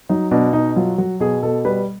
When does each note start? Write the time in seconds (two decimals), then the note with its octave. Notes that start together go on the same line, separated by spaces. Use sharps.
0.09 F#3 D#4
0.31 B2 D4
0.53 B2 D#4
0.76 F#3 F4
0.98 F#3 F#4
1.20 B2 G#4
1.43 B2 A4
1.65 G3 B4